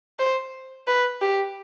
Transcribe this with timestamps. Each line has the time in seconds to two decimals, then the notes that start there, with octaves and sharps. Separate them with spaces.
0.19 C5
0.87 B4
1.21 G4